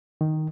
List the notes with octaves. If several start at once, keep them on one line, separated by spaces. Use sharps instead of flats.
D#3